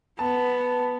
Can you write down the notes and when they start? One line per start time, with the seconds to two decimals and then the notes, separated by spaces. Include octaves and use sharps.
0.19 B3 A5